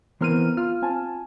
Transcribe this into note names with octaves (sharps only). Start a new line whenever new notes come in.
E3 B3 C4 A#4 F6 D#7
F4 F6
C4 G#5 A5